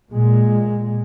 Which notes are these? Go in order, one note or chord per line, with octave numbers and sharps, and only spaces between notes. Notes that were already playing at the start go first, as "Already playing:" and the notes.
A#2 G#3